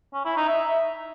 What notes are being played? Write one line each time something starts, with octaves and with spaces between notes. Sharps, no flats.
C#4
E4
D#4
E5